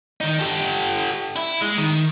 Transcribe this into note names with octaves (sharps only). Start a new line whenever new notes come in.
D#3 D#4
G4 A4
E4
G#3
D#3